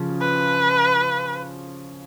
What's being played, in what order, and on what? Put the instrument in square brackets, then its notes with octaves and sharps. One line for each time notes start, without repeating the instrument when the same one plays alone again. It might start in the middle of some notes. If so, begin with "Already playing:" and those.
Already playing: [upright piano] C#3 F3 C#4
[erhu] B4